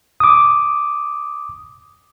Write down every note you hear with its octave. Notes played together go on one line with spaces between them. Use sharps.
D6 D#6